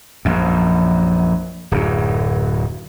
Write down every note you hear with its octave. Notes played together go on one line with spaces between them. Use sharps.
A#1 F#2
D1 F#2